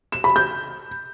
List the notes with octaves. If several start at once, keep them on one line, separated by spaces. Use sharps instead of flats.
E7
B5
G6